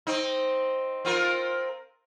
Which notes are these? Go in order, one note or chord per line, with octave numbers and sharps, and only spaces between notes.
C4 D#4
C4 F4 A#4